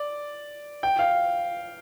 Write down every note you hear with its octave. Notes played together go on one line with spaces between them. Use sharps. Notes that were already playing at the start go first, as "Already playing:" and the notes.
Already playing: D5
G5
F5